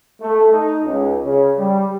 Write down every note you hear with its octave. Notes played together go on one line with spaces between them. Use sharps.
A3
D#4
C#2
C#3
G3